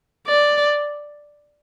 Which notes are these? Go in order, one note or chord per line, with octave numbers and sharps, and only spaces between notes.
D5